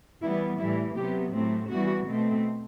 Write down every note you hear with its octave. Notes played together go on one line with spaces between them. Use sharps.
E3 G3 B3 E4
A2 E3 G3 E4
C3 F#3 B3 G4
A2 F#3 A3 C4
E3 G3 B3 F#4
B2 A3 C4